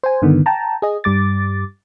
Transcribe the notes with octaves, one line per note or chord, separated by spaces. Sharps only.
C5 G#5
G2 D3 D#3 B3
G5 A5 A#5
G#4 D#5
G2 G3 D6 A6